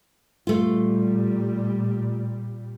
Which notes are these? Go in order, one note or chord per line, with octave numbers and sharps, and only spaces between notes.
A#2 G3 A3 F4